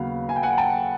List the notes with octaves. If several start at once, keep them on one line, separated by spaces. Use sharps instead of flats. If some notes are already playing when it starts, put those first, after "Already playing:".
Already playing: D#2 C#3 F#3 B3 F5
G#5
G5
F#5 G#5
G5 A5